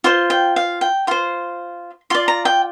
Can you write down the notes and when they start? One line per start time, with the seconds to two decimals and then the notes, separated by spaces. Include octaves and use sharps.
0.04 F4 C5 C6
0.30 G5
0.56 F5
0.81 G5
1.07 F4 C5 C6
2.10 F4 D5 C6
2.28 A#5
2.45 G5